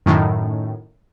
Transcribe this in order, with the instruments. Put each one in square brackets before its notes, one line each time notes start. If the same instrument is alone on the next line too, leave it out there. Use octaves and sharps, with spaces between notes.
[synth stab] F#2 A2 D#3